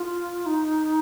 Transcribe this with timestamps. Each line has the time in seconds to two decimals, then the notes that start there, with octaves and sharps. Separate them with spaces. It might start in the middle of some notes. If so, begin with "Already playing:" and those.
Already playing: F4
0.46 D#4